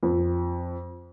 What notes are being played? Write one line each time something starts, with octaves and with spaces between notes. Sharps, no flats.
F2